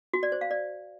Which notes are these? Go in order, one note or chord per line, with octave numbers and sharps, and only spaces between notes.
F#4
D5
C5
F5
D5